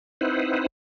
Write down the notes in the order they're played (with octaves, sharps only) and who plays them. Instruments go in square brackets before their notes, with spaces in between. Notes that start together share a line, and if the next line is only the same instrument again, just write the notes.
[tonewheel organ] C4 D#4 E4 B4 C5 F#5